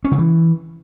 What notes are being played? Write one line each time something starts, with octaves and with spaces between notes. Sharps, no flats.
C#4
C#3
E3